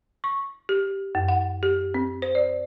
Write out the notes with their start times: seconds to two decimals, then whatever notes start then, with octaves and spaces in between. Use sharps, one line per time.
0.24 C#6
0.69 G4
1.15 F#2
1.28 F#5
1.63 G4
1.94 C4
2.22 C5
2.35 D5